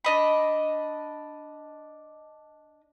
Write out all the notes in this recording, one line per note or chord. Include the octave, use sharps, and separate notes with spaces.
D4 D#5 B5